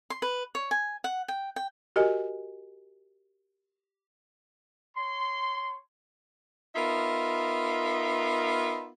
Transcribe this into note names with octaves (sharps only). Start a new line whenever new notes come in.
C6
B4
C#5
G#5
F#5
G5
G5
F#4 G4 A#4 D#5 G#5
C#5 C6
B3 D#4 F4 A#4 E5